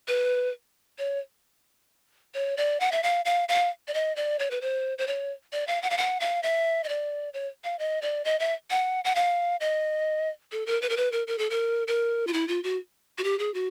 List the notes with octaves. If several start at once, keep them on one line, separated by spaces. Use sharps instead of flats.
B4
C#5
C#5
D5
F#5
E5
F5
F5
F5
D5
D#5
D5
C#5
B4
C5
C5
C#5
D5
F5
F#5
F5
F#5
F5
E5
D#5
D5
C#5
F5
D#5
D5
D#5
E5
F#5
F#5
F5
D#5
A4
A#4
B4
A#4
B4
A#4
A#4
A4
A#4
A#4
F4
E4
F4
F#4
F#4
G4
G#4
F#4